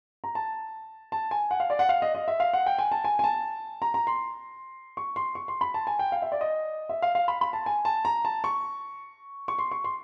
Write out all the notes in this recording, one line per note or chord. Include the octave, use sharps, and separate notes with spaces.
A#5
A5
A5
G#5
F#5
F5
D5
F#5
F5
D#5
D#5
E5
F5
F#5
G5
G#5
A5
G#5
G#5
A5
A#5
A#5
C6
C#6
C6
C#6
C6
B5
A5
G#5
G5
F5
E5
D5
D#5
E5
F5
F5
B5
B5
A5
G#5
A5
A#5
A5
C#6
C#6
C6
C#6
C6